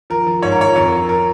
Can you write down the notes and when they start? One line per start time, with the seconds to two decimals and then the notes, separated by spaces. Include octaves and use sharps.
0.10 F3 A#4
0.27 F3
0.42 G#2 C#5
0.52 A#4
0.59 F3 C#5
0.76 F2 A#4
0.92 F3
1.09 A#4